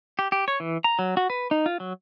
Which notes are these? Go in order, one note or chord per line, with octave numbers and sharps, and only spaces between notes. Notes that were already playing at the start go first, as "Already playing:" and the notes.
G4
G4
C#5
E3
A#5
F#3
F#4
B4
D#4
F4
F#3